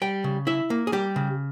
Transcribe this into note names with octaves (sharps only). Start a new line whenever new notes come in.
G3 G5
C#3
E4 E5
A#3
G#4
G3 G4
C#3